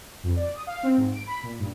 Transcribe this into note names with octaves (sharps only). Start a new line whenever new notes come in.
F2
D5
D#6
F5
C4
G#2
D7
B5
A#2
G2